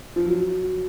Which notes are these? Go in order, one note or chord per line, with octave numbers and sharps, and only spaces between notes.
F3
F#3